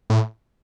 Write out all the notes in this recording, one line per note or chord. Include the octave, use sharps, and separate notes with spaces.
A2